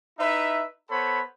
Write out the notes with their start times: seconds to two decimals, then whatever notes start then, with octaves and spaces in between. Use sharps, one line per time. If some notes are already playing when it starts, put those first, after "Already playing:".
0.18 D#4 E4 B4 E5
0.89 B3 A4 C5 C#5 B5